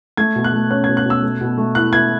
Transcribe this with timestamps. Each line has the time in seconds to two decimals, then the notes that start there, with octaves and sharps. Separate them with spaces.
0.17 A3 G#6
0.36 B2
0.44 F#6
0.53 A3
0.71 C#4 F#6
0.84 B2 G#6
0.97 F#6
1.05 B2 E6
1.23 A3
1.41 B2
1.58 A3
1.75 E4 F#6
1.93 E4 G#6